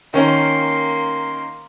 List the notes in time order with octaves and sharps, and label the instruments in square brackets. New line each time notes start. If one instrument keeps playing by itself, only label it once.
[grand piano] D#3 C#4 [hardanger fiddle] A#3 C6